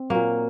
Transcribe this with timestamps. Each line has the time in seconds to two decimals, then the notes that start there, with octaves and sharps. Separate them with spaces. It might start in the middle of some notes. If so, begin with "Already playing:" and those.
Already playing: C4
0.10 A#2 F#3 A#3